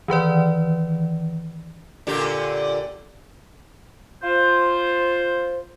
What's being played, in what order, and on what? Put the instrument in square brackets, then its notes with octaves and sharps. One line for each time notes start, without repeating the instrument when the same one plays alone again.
[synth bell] D#3 E3 B4 D5
[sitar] A#2 D3 G4
[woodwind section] F4 C5